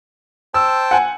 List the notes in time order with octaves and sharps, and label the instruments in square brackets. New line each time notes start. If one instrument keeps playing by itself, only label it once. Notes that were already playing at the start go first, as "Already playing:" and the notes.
[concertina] C5 G5 A5 [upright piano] E6
[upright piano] F#5 G#5